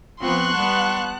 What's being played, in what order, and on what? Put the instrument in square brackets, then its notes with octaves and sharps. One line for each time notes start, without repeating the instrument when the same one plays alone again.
[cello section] F3 B3 [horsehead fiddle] C4 F4 [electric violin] C6 C#6 [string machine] F#6
[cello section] G3 B3 [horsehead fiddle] F#5 A5